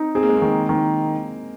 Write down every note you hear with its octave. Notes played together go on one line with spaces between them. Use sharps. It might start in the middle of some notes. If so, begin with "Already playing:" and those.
Already playing: C4 D#4
C4 G#4
A#3
G#3
A#3
D#3
D#3